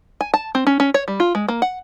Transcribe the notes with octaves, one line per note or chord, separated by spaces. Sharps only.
G#5
A5
C4
C#4
C#4
C#5
G3
F4
G#3
A#3
F#5